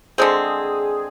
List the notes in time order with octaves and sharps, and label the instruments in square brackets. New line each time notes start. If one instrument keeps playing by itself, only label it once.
[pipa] D3 G#3 C4 [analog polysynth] G#4